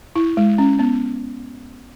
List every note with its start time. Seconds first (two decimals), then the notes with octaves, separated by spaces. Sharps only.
0.16 E4
0.37 G#3
0.58 C#4
0.79 B3